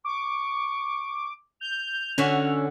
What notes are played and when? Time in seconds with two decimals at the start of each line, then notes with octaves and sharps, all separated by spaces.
0.05 C#6 D6
1.61 G6 F7
2.18 D3 C#4 F#4 E5